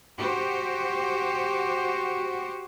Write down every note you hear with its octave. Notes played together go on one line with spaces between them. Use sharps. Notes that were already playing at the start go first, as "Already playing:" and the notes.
F#4 G4 C5